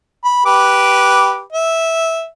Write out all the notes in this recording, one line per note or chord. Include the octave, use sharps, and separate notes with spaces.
B5
G4 B4 D6
E5